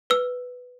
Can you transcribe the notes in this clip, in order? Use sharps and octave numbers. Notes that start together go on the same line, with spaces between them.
B4 E6